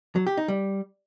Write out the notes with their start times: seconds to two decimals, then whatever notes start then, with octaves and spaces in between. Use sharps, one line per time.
0.16 F#3
0.27 G4
0.37 D#4
0.48 G3